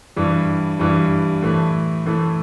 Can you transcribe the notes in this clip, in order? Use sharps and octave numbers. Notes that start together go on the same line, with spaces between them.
G2 E3 G3
G2 E3 G3
A2 E3 A3
A2 E3 A3